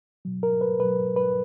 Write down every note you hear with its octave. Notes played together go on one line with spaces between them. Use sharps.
B2 F#3
A#4
B4
B2 F#3 B4
B4